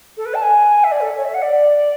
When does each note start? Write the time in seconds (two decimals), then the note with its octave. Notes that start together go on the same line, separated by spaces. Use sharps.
0.17 A4
0.25 B4
0.34 A5
0.42 G#5
0.84 E5
0.91 D5
1.01 A4
1.17 C#5
1.25 E5
1.34 F#5
1.42 D5